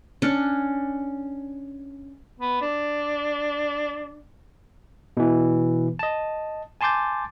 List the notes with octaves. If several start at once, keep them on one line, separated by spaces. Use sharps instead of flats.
C#4 D4
B3
D4
B2 E3
D#5 A5
G#5 A5 C6 D6 G6 A6